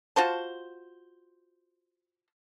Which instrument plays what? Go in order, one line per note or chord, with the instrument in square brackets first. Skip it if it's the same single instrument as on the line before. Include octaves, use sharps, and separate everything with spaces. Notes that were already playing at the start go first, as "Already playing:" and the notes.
[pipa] F4 F#4 C5 A5